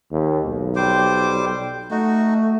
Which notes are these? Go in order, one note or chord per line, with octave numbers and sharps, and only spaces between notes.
D#2
B1
G3 C5 D6
A3 D#4 F#4